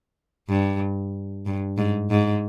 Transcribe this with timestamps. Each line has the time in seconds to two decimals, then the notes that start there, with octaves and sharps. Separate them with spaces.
0.49 G2
1.46 G2
1.78 G#2
2.11 G#2